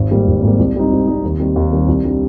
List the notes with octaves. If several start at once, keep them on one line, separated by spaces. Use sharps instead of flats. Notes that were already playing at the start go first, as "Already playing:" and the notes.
Already playing: G#1
G#2 G3 A#3
G#1
G#2 G3 A#3
C2
C3 G3 C4 D#4
C2
C3 G3 C4 D#4
D#2
D#3 G3 C4
D#2
D#3 G3 C4
C2
C3 G3 D4